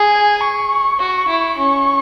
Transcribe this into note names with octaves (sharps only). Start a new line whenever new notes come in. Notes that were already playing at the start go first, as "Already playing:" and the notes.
Already playing: G#4
G#5
C#6
F#4
E4
C#4 C#6